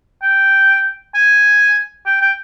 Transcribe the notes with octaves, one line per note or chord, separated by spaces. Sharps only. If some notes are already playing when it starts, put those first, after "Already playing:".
G5
G#5
G5
G5